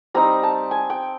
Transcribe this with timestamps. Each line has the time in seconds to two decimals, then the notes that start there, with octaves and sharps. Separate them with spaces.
0.14 G3 C4 D#4 A#5
0.43 A5
0.71 G#5
0.90 G5